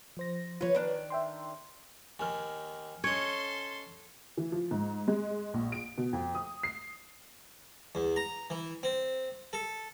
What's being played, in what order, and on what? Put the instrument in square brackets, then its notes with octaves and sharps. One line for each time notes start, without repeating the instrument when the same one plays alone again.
[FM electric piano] F3 C5 A#6
[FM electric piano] F3 F4 [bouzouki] B4 C#5
[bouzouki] D#3 D4 [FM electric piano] B4 F#6
[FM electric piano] E5 G5 C6
[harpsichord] D#2 D#3 [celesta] G#5 F6
[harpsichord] C#4 D#5 [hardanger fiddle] A4 C6 [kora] C#5
[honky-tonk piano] E3
F3
G#2
G#3
A#1
D7
B2
F2
D#6
C7
[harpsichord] E2
A#5
E3
C4
A4